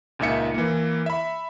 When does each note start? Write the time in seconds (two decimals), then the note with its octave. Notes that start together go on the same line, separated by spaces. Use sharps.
0.19 C#2 A#2 D#4 E5 C#7
0.54 E3 A#3
1.06 E5 B5